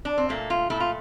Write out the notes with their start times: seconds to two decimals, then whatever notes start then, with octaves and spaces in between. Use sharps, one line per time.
0.05 D4
0.18 C4
0.29 A#2 A3 A#3
0.50 F4
0.70 A#2 A3 E4
0.80 F4